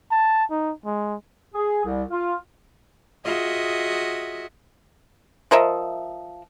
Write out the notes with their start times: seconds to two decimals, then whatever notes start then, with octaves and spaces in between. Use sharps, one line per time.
0.11 A5
0.50 D#4
0.85 G#3
1.55 G#4
1.85 C2
2.10 F4
3.24 F4 F#4 G#4 D#5 E5
5.51 F3 A#4 D#5 E5